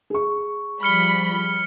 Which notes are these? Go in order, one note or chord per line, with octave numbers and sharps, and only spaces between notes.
G#4 C#6
F3 G3 B5 F6 C#7 G7